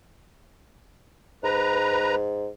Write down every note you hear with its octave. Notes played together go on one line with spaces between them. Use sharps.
G#2 B4 A#5